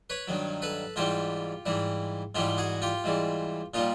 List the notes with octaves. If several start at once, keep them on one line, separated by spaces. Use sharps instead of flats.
B4 C#5
G2 D#3 F#3
A4 B4
G#2 E3 G3 F4 G4
G#2 E3 G3
G#2 E3 G3 F4 G4
F#4 G#4
F4 G4
G#2 E3 G3
A#2 G3 D#4 F4